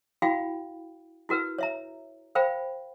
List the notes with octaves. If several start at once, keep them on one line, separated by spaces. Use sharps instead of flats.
E4 F#4 F5 G5 B5
E4 F#4 A#4 B4 E6
C#5 E5 A#5
A#4 C5 F5 G5 B5